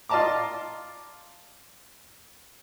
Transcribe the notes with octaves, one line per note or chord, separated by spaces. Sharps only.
F4 D5 D#5 A5 A#5 D6